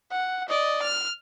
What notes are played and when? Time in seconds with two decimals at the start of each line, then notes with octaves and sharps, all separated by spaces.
0.12 F#5
0.49 D5 D#5
0.83 F6